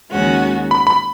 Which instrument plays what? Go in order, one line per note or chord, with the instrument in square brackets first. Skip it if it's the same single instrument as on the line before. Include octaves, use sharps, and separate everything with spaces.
[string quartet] D#2 D#3 G#3 C#4 F#4
[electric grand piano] B5
B5